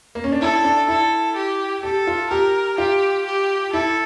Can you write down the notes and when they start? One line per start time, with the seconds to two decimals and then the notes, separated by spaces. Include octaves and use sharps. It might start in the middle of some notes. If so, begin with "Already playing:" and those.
0.15 A#3
0.24 C#4
0.32 D4
0.42 E4 A4
0.64 D4
0.88 E4 A4
1.36 G4
1.83 G4 A4
2.07 F4
2.30 G4 A#4
2.78 F4 G4
3.26 G4
3.73 E4 A4